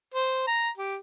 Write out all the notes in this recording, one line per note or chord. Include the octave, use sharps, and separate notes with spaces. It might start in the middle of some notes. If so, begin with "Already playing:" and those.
C5
A#5
G4